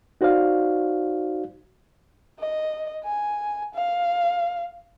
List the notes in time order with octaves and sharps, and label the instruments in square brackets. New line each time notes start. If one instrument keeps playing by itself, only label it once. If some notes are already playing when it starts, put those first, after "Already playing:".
[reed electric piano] D#4 F#4 C5 D5 F5
[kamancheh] D#5
G#5
F5